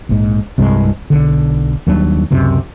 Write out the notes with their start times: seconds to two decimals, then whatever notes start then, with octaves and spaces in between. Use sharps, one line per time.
0.09 A#1 G#2
0.58 C2 G2 C3 G#3
1.10 B1 D3
1.87 D#2 F#3 G3 D4
2.31 C#2 F#2 C3